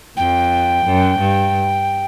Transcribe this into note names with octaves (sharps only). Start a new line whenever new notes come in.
F2 G5
F#2
G2